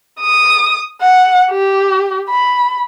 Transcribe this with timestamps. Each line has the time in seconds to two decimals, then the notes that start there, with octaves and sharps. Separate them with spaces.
0.21 D#6
1.02 F#5
1.51 G4
2.30 B5